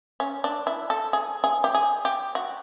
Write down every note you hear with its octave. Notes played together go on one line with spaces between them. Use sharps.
C#4
D4
E4
A4
G#4
G#4
G4
G#4
G4
F#4